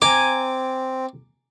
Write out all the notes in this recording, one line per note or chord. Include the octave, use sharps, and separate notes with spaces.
C4 G#5 A#5 D6